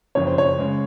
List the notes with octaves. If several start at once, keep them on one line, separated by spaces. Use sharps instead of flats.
F#1 F2 C#3 C#5
C5
C#5
C#3 G#3